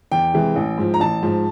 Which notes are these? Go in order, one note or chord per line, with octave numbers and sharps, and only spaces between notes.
E2 G5
C3 E3 G#3
A1
G#2 F3
A#5
A1 A5
G#2 F3